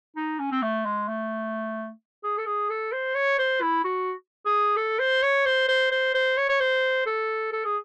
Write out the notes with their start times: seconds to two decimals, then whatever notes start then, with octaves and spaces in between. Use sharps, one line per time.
0.16 D#4
0.39 C#4
0.51 C4
0.62 A3
0.85 G#3
1.08 A3
2.23 G#4
2.38 A4
2.46 G#4
2.69 A4
2.92 C5
3.15 C#5
3.39 C5
3.61 E4
3.84 F#4
4.46 G#4
4.76 A4
4.99 C5
5.23 C#5
5.45 C5
5.68 C5
5.91 C5
6.14 C5
6.37 C#5
6.49 C#5
6.60 C5
7.06 A4
7.52 A4
7.65 G#4